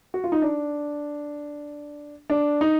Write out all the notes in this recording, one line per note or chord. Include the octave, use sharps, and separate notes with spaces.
F#4
F4
D#4
D4
D4
D#4